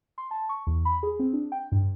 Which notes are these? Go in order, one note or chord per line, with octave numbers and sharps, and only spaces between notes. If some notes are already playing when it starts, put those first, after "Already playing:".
C6
A5
C#6
E2
B5
G#4
C4
D4
G5
G2